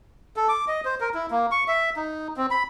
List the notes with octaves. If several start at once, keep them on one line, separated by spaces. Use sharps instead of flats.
A4
D6
D#5
C5
A#4
E4
A#3
C#6
E5
D#4
C4
B5